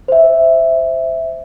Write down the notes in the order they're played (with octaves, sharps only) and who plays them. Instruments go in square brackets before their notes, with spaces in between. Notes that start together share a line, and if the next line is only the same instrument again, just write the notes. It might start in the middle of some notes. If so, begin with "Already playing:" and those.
[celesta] C5 E5